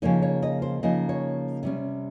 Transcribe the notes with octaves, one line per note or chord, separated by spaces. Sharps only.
C#3 F3 A#3 D#4 C#5
C#5
D#5
C5
C#3 F3 A#3 D#4 D#5
C#5
C3 G3 C#4